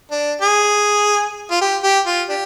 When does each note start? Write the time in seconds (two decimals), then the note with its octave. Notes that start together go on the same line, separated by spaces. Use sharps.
0.11 D4
0.42 G#4
1.51 F4
1.61 G4
1.83 G4
2.07 F4
2.29 D4 G4